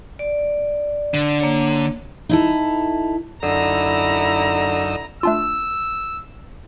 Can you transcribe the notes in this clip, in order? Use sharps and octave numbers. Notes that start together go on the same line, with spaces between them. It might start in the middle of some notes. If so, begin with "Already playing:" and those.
D5
D3
A#3 C#5
D#4 E4 A4
F#2 D3 D#4 E4 A#5 E6
A3 D4 F4 E6